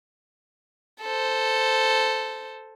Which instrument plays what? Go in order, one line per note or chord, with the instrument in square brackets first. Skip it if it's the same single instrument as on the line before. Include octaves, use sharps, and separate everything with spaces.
[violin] A4 C5